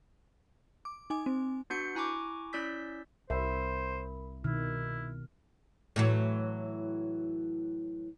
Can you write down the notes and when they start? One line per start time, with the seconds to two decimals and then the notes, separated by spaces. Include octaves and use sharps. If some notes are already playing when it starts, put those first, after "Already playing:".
0.85 D6
1.10 D#4 G#5 D6
1.26 C4
1.70 B3 D4 F#4 G6 C7 C#7
1.95 E4 G#5 A#5 C#6 D6
2.53 C#4 E4 D5 E6 G6 B6
3.30 C2 A#4 C5 E5 B5
4.44 B2 D#3 E4 F6
5.96 A2 E3 F#3